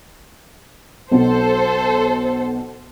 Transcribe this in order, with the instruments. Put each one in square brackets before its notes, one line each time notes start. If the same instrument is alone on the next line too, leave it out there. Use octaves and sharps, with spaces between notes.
[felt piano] B1 B2 [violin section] A4 C5